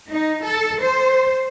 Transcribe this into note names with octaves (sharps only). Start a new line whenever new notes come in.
D#4
A4
C5